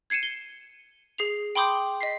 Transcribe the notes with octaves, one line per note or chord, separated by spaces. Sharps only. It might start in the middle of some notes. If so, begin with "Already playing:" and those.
G#6 C7 C#7 D#7 E7
G7
G#4 C7 F7
G5 B5 C6 D6 D#6 G6
D#5 B6 C7